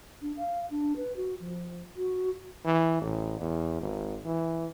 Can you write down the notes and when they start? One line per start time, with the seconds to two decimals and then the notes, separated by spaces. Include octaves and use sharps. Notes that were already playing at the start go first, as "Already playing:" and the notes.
0.22 D4
0.37 F5
0.71 D4
0.97 B4
1.17 F#4
1.40 F3
1.96 F#4
2.66 E3
3.01 A1
3.40 E2
3.81 G#1
4.25 E3